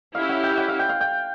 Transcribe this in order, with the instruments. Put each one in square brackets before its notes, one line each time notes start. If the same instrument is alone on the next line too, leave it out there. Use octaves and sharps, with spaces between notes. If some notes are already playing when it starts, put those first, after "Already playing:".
[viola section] C#4 E4 G4 [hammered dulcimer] F5
[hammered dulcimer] F#5
G5
F#5
F5
G5
F5
G5